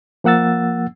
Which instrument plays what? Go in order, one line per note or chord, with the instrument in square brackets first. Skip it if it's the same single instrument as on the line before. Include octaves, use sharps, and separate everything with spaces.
[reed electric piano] F3 A#3 F#5 E6 A6